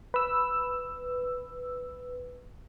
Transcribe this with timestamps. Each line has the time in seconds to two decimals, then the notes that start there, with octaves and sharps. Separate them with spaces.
0.14 B4 E6